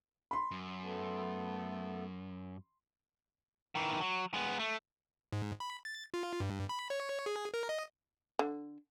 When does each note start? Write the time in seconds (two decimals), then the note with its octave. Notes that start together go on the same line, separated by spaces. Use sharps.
0.31 B5 C6
0.51 F#2
0.82 A3 B3 A4
3.75 D#3 E3
4.01 F#3
4.34 G#3 B3
4.59 A3
5.32 G#2
5.60 B5
5.85 A6
6.14 F4
6.40 G2
6.69 B5
6.90 C#5
7.26 G#4
7.54 A#4
7.69 D#5
8.39 D3